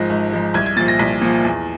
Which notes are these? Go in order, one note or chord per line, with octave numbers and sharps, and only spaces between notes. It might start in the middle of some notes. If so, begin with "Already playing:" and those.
Already playing: G#1 G#2 F3 A#6
G#1
G#2 F3
C2 G#6
G#6
A#2 F3 A6
A#6
C2 B6
A#2 F3
E2